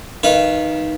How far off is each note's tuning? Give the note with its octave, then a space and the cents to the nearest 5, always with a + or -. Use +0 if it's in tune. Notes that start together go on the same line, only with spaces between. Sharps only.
D#3 +0 B4 -15 F5 -25